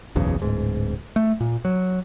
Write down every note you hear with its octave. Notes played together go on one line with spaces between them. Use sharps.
F#1 B1 E2 C#3
D1 G#2
A3
A#2
F#3